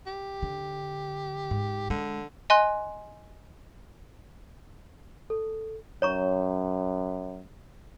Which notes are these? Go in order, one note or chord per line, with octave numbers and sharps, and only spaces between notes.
G4
D3
G#2
D3 G#3
D#5 G#5 C6 F#6
A4
F#2 C#5 A#5 C#6